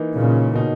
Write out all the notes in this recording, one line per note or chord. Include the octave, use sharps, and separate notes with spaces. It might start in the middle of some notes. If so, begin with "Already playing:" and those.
Already playing: E3 A#3 D#4
A#2 C#3
B2 A#3 D#4